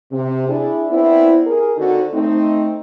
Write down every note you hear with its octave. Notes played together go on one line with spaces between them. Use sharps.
C3
D4 E4 G#4
B3 C4 D4 E4
G#4 A#4
D3 C4 D4 D#4 F#4 A4
A3 C4 D#4